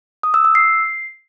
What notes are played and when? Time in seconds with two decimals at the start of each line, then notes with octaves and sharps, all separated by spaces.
0.23 D#6
0.34 E6
0.45 E6
0.55 C7